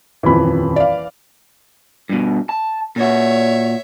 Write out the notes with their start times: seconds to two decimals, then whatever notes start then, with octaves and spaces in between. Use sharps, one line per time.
0.23 D#1 F2 E3 B5
0.76 D5 F5
2.09 G2 B2
2.49 A5
2.96 A#2 F#4 C#5 E5